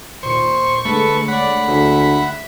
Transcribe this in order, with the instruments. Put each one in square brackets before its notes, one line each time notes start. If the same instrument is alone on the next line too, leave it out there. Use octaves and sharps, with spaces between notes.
[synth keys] D#2 A#2 [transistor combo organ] C5 [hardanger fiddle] C#6
[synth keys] D3 G#3 A3 [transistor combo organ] A4 B4
[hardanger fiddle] C#5 D5 [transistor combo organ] F#5 B5
[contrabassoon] D2 [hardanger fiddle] E5